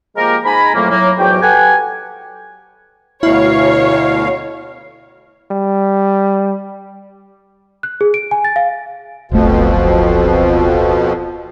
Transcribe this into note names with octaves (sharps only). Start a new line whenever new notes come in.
F3 G#3 A#3 F4 G4 A#4
G#2 G#5 A#5 B5
F2 A2 F#3 A3 A#3
A2 F#3 A#3
E2 G#2 F#3 F#4 G4 G5
G4 A4 B4 F#5 G#5
D2 B2 E4 C#5 F5
G3
F#6
G#4
D7
G#5
A6
F5
D1 G1 F2 B2 F3 A3